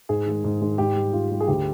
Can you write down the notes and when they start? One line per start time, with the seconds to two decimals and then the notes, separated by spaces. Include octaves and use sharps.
0.09 G#2 G#4
0.26 D#3 G#3
0.44 G#2
0.62 D#3 G#3
0.78 G#2 G4
0.96 G3
1.13 G#2 F4
1.31 G3
1.40 G#4
1.48 D2 G4